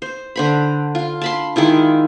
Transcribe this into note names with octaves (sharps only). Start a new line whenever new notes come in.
C5
D3 C5 B5
F4
A5 B5 C6
D#3 G#3 E4 F4